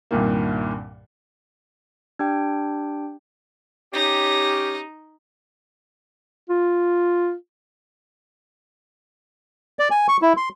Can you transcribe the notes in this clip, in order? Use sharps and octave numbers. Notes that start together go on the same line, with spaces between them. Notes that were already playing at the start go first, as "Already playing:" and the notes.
C2 G2 A#2 D#3 A#3
D4 G4 G5
C#4 D#4 G4
F4
D5
G#5
C#6
E4
C6